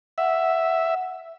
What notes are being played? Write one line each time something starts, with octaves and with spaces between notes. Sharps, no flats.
E5 F#5